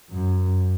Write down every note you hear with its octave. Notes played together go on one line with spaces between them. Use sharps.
F#2